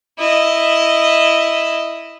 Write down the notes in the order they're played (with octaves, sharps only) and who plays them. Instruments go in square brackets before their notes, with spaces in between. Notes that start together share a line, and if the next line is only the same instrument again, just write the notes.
[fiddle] E4 D#5